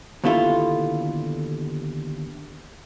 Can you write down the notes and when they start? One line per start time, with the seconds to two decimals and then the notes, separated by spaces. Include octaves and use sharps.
0.24 D#2 B2 D3 A3 E4 F4